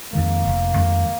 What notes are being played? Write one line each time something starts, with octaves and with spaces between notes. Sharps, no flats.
F2 D#3 G#3 A#3
F1
F2 D#3 G#3